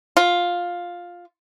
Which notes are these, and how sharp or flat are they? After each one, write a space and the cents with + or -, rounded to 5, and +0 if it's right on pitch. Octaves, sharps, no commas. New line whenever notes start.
F4 +10